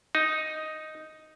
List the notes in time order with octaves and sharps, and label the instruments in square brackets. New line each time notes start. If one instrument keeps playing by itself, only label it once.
[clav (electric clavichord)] D#4